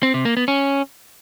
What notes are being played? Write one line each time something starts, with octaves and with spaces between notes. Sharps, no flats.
C4
C3
A#3
B3
C#4